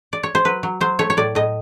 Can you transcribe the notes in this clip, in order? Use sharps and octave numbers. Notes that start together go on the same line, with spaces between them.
D5
C#5
C5
F#3 B4
F#3
F#3 C5
A3 C#5
C#5
A2 D5
A2 D#5